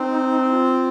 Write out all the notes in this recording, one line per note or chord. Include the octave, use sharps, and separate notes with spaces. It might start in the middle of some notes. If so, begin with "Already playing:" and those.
Already playing: C4 D#4
F4